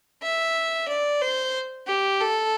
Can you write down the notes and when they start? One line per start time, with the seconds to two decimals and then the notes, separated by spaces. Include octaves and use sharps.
0.23 E5
0.88 D5
1.21 C5
1.87 G4
2.21 A4